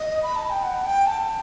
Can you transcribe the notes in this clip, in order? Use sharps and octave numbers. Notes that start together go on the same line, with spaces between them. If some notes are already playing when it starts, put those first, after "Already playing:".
Already playing: D#5
B5
A5
G5
F#5
G5
A5